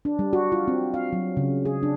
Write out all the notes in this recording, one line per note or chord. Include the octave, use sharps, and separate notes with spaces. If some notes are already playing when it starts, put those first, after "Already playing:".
D4
G3
F#4
F4
C4
F5
F#3
C#3
G#4
D4